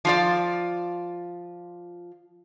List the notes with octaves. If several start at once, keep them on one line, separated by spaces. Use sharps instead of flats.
F3 F4 D5